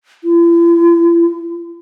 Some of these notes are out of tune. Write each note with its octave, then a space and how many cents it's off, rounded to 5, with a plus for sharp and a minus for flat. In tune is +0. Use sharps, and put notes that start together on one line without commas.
E4 +45